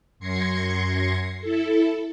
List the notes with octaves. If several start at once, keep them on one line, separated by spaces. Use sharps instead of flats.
F#2 C6 G#6 A#6 C7 C#7
E4 A4